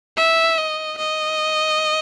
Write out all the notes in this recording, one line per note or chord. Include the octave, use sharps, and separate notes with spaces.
E5
D#5
D#5